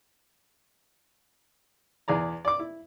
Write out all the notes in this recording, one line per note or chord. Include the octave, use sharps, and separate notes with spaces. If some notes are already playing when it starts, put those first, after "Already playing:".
E2 G#4 D5 A#5
D5 D6
E4